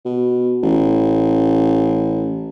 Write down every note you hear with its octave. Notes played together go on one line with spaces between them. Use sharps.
B2
A1